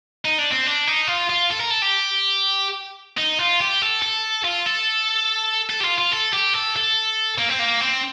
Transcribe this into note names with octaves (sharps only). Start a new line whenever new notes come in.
D#4
D4
C4
D4
D#4
F4
F4
A4
A#4
A4
G4
D#4
F4
G4
A4
A4
F4
A4
A4
G4
F4
F4
A4
G4
A4
A4
A#3
C4
A#3
C4